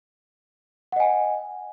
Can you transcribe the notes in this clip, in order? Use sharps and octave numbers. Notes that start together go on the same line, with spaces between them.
D#5 F#5 G#5